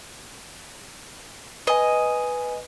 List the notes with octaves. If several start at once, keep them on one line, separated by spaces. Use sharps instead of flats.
B4 D#5 G#5